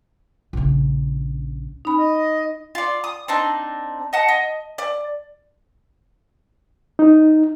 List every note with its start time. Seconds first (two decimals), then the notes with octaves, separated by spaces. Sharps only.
0.53 A#1 C#3
1.85 C#4 D#4 B5
1.97 D#5
2.75 F4 D5
3.04 D#6
3.28 C4 D4 D#4
4.13 D#5 F#5 A5
4.28 D#5
4.78 D5
6.99 D#4